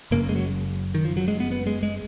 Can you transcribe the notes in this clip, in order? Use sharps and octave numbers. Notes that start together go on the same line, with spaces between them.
F#1 F#2 C#3 A#3
G#3
F#3
D#3
F3
F#3
G#3
B3
B3
G#3
G#3